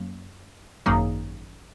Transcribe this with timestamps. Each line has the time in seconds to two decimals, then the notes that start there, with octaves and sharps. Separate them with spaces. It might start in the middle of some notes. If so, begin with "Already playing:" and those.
Already playing: F#2 F#3 A#3
0.86 G#1 F#2 F#3 A#3 D#4 G#4